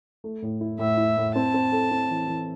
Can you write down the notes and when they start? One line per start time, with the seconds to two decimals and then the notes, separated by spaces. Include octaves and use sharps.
0.24 A3
0.42 A2
0.61 E4
0.79 A2 E5
0.97 E4
1.17 A2
1.35 C4 A5
1.54 C4
1.72 A4
1.91 C4
2.10 E3
2.28 E3